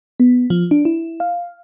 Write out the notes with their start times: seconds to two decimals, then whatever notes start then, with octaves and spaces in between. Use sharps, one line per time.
0.20 B3
0.50 F3
0.71 D4
0.85 E4
1.20 F5